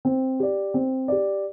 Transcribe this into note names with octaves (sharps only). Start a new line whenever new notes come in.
C4
G4 D5
C4
G4 D5